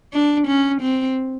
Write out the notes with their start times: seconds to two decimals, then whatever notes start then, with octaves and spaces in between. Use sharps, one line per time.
0.13 D4
0.47 C#4
0.82 C4